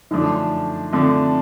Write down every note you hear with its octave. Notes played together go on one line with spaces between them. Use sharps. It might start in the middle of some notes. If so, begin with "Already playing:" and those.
F#2 D3 F3 A3 D4 D#4
D3 F3 A3 C4 D4